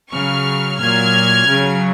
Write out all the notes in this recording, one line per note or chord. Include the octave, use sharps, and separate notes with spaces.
C#3 F#3 C#6 F6
A#2 F#3 F6 G#6
C#3 F#3